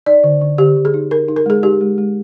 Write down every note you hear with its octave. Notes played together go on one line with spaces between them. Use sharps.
D#4 D5
D3
D3
D3 G4
D3
G#4
D#4
D#4 A#4
D#4
A#4
G#3 G#4
D#4 G4
G#3
G#3